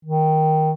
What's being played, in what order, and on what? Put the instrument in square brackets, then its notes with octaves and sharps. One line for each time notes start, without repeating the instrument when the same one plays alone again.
[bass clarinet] D#3